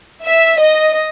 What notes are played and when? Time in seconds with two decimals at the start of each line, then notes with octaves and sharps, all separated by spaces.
0.25 E5
0.60 D#5